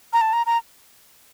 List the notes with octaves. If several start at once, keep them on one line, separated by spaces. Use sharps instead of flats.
A#5
A5
A#5
A#5